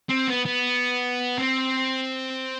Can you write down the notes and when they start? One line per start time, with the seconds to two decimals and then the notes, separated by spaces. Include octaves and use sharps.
0.09 C4
0.28 B3
0.45 B3
1.38 C4